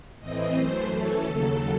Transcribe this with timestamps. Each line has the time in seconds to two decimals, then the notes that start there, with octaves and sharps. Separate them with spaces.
0.20 A2 E3 C4 D#5
0.54 F#2 E3 A3 C5
0.88 F#2 E3 A3 C#4 A4
1.23 D#2 C#3 F#3